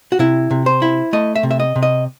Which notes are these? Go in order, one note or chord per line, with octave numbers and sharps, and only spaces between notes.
F#4
C3 E4
C3
C5
E4
A3 D#5
E5
C3
E5
D#5
C3
D#5